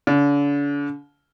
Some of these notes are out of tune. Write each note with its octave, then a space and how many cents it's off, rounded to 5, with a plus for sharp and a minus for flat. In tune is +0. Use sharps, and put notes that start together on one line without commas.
D3 -40